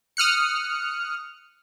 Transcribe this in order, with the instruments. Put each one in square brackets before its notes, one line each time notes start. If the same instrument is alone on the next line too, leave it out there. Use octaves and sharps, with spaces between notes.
[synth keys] D#6 F6 F#6 C#7